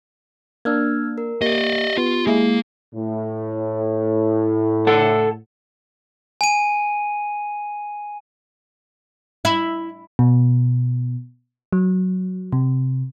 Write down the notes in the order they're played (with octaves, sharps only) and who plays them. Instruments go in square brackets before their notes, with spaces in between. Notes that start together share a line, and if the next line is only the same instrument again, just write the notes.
[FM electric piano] A#3 D4 [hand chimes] E6 F6 G#6
[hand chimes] A#4
[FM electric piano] A#3 [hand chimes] G4 [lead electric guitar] D5 D#5
[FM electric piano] B3 [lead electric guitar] F4
[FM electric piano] G#3 E4 G#4 [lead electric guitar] A#3
[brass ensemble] A2
[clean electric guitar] A4 F#5 A5
[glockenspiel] G#5 D#7
[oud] E4
[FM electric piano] B2
F#3
C3